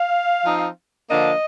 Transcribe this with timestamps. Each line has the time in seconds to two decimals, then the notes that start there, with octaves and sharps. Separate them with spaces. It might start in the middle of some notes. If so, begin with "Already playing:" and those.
Already playing: F5
0.45 F3 C4 D#4
1.10 D3 F3 A#3 D4 D#5